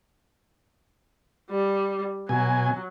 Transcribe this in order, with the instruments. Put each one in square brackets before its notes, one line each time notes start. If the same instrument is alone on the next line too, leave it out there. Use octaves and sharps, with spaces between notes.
[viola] G3
[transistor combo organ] B2 G#5 [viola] F#3